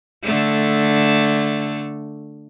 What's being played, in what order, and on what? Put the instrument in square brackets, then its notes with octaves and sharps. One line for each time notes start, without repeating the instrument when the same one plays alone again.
[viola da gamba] D3 A3